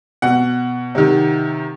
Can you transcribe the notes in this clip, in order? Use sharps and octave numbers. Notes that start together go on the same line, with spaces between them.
B2 F#5
C3 D#3